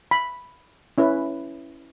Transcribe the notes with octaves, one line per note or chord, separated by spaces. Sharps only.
B5
C#4 E4 B4